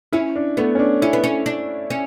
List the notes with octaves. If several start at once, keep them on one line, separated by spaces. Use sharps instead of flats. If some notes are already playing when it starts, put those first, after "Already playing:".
C#4 E4
D4
A3 B3
C#4
D4
C#4 E4
B3
C#4
D4
C#4